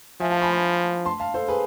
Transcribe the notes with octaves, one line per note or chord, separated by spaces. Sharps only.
F3 E5 G#5
F5 A5
G#5 B5
G#5 B5
A5 C6
F5 A5
A4 C5
G#4 B4